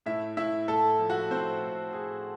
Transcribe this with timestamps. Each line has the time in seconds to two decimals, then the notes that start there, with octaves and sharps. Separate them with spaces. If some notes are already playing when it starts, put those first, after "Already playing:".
0.06 A2 E4 E5
0.37 A2 E4 E5
0.68 A2 A4 A5
0.99 F3
1.10 F#4 F#5
1.30 A2 C4 C5
1.61 A2
1.92 A2 G#4